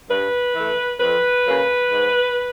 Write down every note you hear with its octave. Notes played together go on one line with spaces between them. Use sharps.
G2 B4
E3 A3
F2 B4
C#3 F#3 A#3
G#2